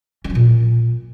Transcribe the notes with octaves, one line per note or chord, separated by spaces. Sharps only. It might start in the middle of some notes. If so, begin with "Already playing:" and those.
C#4
F#3
A#2